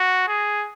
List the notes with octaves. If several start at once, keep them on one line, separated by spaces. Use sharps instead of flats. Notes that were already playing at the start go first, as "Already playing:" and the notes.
Already playing: F#4
G#4